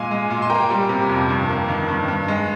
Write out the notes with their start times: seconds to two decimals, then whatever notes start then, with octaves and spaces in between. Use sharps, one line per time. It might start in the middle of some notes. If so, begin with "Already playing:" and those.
Already playing: A#2 G#3 F5 G#5
0.11 G#3
0.30 A#2
0.42 C6
0.50 A#3 G5 A#5
0.70 G3
0.89 C3
1.09 F2
1.29 G2
1.49 A#3
1.69 D#3
1.89 G2
2.08 G2
2.28 G#3